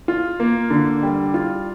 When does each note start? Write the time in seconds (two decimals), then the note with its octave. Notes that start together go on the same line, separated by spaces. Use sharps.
0.08 F4
0.40 A#3
0.70 D3
1.03 G3
1.34 F4